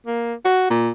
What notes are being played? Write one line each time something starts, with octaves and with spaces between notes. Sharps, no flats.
A#3
F#4
A#2